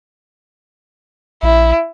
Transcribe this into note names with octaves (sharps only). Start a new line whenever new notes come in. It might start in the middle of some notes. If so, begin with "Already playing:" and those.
A#1 E4